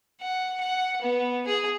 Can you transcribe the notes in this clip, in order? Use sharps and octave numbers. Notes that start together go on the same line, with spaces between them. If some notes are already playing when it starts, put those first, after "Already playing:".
F#5
F#5
B3
G#4